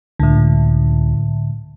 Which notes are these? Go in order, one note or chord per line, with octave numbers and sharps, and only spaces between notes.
C#2 A2 D3